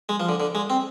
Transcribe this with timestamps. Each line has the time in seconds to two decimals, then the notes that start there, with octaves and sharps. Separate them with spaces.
0.09 G#3
0.20 F3
0.29 D3
0.40 D3
0.55 G#3
0.70 C4